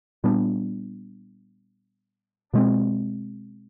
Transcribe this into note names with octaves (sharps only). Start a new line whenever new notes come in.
A#2 G3 B3 D4
B2 G#3 C4